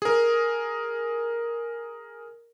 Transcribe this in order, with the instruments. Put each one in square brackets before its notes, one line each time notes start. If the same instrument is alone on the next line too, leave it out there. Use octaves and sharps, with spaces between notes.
[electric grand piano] G#4 A#4